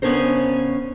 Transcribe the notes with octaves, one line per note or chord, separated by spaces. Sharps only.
C#3 B3 C#4 D4 A#4 C5